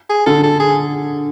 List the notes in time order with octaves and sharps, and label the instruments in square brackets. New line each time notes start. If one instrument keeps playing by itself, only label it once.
[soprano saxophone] G#4
[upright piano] D3 [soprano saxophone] A4
[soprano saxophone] A4
G#4